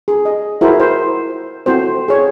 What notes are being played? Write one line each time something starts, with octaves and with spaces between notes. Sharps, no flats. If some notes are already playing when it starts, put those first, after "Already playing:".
G#4
D#5
E4 F#4 G#4 A#4 C5
C5
C4 E4 F#4 A4 C5
G#4 C#5